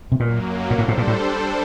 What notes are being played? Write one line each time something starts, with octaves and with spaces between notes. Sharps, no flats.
C3
F#2 A#2 F#3 A#3
A#2
A2 G3 D4 A4 C5
A2
A#2
A2